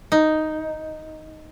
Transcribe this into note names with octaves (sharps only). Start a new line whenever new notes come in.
D#4